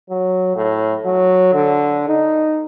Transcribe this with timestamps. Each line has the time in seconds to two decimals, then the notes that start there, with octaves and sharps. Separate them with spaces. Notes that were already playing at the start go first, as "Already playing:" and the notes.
0.10 F#3
0.56 A2
1.05 F#3
1.53 D3
2.08 D#4